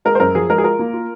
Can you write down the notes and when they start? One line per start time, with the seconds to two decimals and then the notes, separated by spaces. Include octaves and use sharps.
0.05 G#3 A#4
0.15 C5
0.20 F#2 A#4
0.35 F3 G#4
0.50 G#3 A#4
0.58 G#4
0.64 F4 A#4
0.79 A#3
0.93 F4